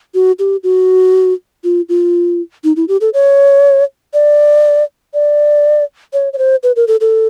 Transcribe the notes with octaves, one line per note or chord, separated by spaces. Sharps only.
F#4
G4
F#4
F4
F4
D#4
E4
G4
A4
C#5
D5
D5
C#5
C#5
C5
B4
A#4
A4
A4